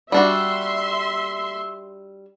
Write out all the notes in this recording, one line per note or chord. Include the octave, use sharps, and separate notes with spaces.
G3 D4 F#4 E5 C6